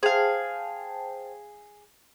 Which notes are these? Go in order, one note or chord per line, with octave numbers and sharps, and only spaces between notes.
G#4 C5 F5 G5 A5